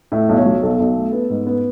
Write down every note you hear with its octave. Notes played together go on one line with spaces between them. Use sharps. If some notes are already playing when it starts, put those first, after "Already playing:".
A2 E5
B1
C#5
F#3
B1 A4
B1
A3
B3
G#2
B3